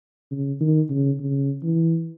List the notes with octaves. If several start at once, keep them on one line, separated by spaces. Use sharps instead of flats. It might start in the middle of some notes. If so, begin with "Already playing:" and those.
C#3
D#3
C#3
C#3
E3